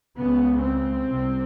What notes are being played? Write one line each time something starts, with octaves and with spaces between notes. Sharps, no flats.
C#2 C#3 B3
C4
C2 C3